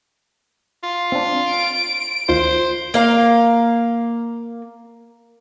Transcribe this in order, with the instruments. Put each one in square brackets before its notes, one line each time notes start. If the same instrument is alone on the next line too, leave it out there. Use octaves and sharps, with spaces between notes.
[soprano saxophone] F4
[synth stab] C4 D4
[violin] D7
[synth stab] D2 D#3 F4 [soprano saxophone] C5
[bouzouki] A#3 F5